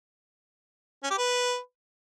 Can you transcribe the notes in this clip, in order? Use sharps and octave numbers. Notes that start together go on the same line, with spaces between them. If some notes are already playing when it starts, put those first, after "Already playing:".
C#4
G4
B4